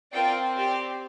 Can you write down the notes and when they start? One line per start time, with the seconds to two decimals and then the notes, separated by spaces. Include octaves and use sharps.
0.13 C4 F4 A#4 D5 G5
0.57 G4 D5 G5